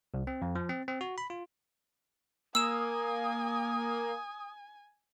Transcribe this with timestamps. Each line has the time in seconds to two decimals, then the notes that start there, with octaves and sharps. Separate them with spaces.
0.14 C2
0.27 C4
0.42 F2
0.55 F3
0.69 C4
0.88 C4
1.01 F#4
1.18 B5
1.30 F4
2.55 A#3 G#5 D#6 E6 E7